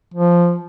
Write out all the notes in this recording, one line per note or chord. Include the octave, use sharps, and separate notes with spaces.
F3